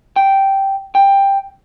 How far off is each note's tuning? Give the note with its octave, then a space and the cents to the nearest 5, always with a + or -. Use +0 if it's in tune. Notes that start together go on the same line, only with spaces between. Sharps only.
G5 -5
G5 +10